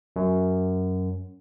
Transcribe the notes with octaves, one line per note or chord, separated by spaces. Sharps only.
F#2